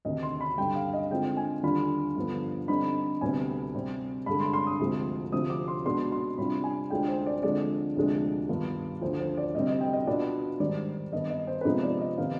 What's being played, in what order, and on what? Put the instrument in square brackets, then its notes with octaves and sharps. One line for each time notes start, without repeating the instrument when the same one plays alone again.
[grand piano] D2 C3 D#3 D#5
C6
B5
G2 D3 G3 G5
F5
D#5
D3 G#3 C4 F4 G5
G#5
D#2 D3 G3 D4 F4 B5
G2 D3 F3 B3
D3 G3 C4 D#4 B5
D2 C3 G3 B3 G#5
C3 G3 C4
G2 D3 G#3 B5
C6
C6
D#6
D2 C3 F3 G#3
D2 C3 F3 C4 D#6
D6
C6
B2 G#3 B3 D4 C6
C6
C3 G3 D4 F4 B5
G#5
D2 D3 G#3 D4 F4 G5
C5
D5
D3 F3 G#3 C4 D5
D2 C3 F3 G#3 D4
G2 D#3 B3 F4
D2 D3 F3 C5
C5
D5
D2 C3 G3 C4 D#5
D#5
G5
D#5
B2 B3 D4 F4 D5
G#2 D#3 G3 D5
G2 D#3 B3 D#5
D#5
C5
B4
C3 F3 G#3 B3 D#4 C5
D5
D#5
C3 D#3 B3 D#4 F5